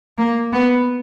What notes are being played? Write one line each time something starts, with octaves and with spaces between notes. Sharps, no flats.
A#3
B3